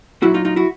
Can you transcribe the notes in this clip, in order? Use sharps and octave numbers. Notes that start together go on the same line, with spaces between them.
A#2 F#3 E4 F#4
D#4 F4
D#4 F4
E4 F#4